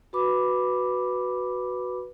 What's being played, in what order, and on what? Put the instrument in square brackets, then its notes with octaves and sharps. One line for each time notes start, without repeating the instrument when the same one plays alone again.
[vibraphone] F#4 B4 B5 D6